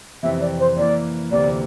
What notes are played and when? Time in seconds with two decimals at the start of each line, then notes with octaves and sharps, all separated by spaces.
0.23 F2 C3 E3 E5
0.41 D5
0.59 C5
0.76 E3 A#3 E4 D5
1.31 D2 C3 E3 A#3 D5